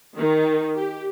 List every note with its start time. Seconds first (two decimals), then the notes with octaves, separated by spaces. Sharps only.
0.18 D#3
0.76 G4